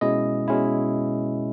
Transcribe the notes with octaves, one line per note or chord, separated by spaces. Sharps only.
B2 G#3 C#4 E4 D#5
B2 G#3 C#4 E4